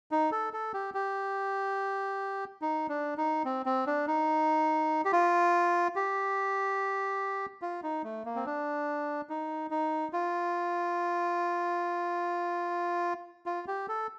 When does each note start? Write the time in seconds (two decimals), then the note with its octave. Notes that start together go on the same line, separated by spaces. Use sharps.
0.11 D#4
0.32 A4
0.53 A4
0.74 G4
0.94 G4
2.62 D#4
2.89 D4
3.18 D#4
3.45 C4
3.66 C4
3.87 D4
4.07 D#4
5.05 G4
5.13 F4
5.96 G4
7.62 F4
7.83 D#4
8.04 A3
8.25 A#3
8.36 C4
8.46 D4
9.29 D#4
9.71 D#4
10.13 F4
13.46 F4
13.68 G4
13.88 A4